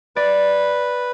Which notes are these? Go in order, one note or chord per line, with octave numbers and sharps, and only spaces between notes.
B4 D5